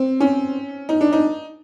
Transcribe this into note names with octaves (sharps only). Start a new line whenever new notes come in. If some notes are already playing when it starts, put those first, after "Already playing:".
Already playing: C4
C#4
D#4
D4
D#4